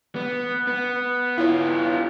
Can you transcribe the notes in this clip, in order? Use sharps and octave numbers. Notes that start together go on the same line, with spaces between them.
B3
B3
B3 E4 F4 C#5